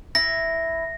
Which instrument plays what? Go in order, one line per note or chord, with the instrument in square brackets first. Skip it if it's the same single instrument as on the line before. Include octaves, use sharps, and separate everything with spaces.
[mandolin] E4 [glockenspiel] A#6